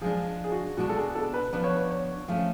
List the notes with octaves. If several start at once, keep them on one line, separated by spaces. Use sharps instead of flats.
F3 G#3 D4 G#4
G#4
F#4
B2 G#3 B3 D4 F#4
A4
G#4
A4
B4
F3 B3 D4 B4
C#5
B4
C#5
F3 A3 C#4 F5